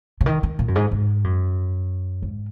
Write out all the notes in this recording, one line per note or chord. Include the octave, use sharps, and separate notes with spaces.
C#3
D#3
D#3
A#2
F#2
G#2
G#2
F#2
G#2